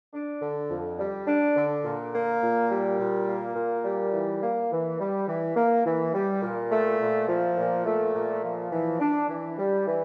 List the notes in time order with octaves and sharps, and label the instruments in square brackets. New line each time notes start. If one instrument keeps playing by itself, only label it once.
[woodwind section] D4
D3
F2
G3
D4
D3
A#2
A#3
A#2
G3
A#2
A#3
A#2
G3
E3
A#3
E3
G3
E3
A#3
E3
G3
A#2
A3
A#2
F3
A#2
A3
A#2
F3
E3
D4
E3
G3
E3